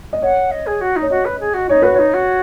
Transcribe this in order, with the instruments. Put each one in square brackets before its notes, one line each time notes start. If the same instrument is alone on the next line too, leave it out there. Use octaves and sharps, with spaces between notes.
[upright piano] D#5
[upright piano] C#5 [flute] F#5
[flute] D#5
G#4
F#4
D#4
[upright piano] C#5
[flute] F#4 [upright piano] D#5
[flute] B4
G#4
F#4
[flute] D#4 [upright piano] C#5
[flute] F#4 [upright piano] B4
[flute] D#4 [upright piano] C#5
[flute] F#4